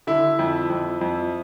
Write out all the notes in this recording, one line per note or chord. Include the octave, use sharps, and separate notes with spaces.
D3 E4
F2
F2
F2